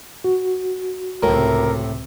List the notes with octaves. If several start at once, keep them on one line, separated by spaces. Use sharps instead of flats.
F#4
C#2 A2 C3 A#4